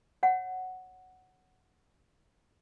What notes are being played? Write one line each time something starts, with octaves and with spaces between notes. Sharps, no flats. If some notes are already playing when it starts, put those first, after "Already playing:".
C#5 F#5